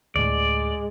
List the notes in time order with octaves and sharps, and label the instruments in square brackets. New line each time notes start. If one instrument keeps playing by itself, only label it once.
[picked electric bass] D2 A2 [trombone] G#3 [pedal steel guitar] D5